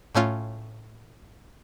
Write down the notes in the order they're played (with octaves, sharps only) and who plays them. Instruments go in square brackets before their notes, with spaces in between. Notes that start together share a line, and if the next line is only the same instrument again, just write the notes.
[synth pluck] A2 A3 C#4 F4